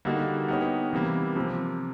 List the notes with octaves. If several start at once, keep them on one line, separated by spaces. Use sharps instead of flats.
D3 G3 A#3 D#4 F#4
B3 D#4 G4 A#4 C#5
C3 E3 G3 A#3
C3 F3 A#3